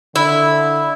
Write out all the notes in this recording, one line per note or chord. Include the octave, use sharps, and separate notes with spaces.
D3 E4